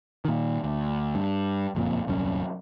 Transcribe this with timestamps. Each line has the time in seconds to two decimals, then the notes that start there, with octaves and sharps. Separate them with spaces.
0.25 A#2 D#3
0.64 D2
1.15 G2
1.75 F#1 F2 A#2
2.07 D#1 C2 F#2 C#4